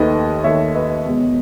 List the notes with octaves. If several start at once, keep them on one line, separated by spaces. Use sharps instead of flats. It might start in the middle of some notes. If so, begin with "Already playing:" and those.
Already playing: D#2 D#3 A3 B4 D#5
D#2 D#3 A3 C#5 E5
B4 D#5
E1 E2 B2 G#3